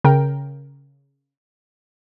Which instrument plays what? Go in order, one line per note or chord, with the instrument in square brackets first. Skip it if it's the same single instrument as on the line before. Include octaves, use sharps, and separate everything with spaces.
[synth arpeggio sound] C#3 A#4 G5